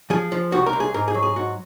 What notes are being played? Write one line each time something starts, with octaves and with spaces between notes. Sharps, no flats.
F3 G#4
F3
C2 F#4
A#4
C2
G#4
G#2 A#4
G#4
F#3
G#4
G#2 F#4